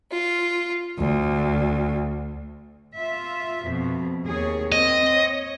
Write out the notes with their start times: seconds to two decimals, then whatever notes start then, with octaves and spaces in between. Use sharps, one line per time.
0.11 F4
0.97 D2
2.97 F4 E5
3.67 F2 B2
4.26 D#2 G#4 C#5
4.72 C4 D#5
5.13 C#5